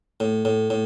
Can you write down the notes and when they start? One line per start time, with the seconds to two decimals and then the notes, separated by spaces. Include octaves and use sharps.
0.20 A2
0.45 A2
0.70 A2